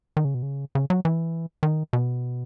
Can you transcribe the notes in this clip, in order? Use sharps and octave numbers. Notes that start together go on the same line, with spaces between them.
D#3
C#3
B2
C#3
C#3
F#3
E3
D#3
B2